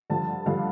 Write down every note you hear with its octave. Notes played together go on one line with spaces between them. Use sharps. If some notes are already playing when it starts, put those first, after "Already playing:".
G2 D3 F3 A5
G2 D3 F3 F5